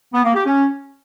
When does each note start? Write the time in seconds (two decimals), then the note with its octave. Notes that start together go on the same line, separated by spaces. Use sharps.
0.14 B3
0.24 A#3
0.35 G4
0.45 C#4